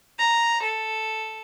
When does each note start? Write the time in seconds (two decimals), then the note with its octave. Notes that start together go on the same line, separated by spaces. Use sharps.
0.17 A#5
0.61 A4